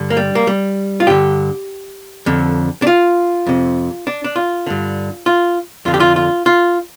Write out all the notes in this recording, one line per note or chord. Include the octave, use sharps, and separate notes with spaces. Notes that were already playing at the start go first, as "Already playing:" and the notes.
Already playing: G2 D3
A#3
G3
A#3
G3
F4
G2 D3 G4
F2 D3
D4
F4
F2 C3
D4
D4
F4
G2 D3
F4
F2 D3 F4
G4
F4
F4
F4